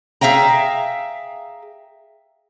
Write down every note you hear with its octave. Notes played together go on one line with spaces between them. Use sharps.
G#4 E5 F5 G5 A#5